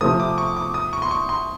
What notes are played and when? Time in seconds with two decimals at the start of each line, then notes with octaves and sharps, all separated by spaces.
0.01 C3 F3 A3 D#6
0.20 D6
0.38 C#6
0.56 D6
0.74 D#6
0.93 C#6
1.02 C6
1.11 C#6
1.29 C6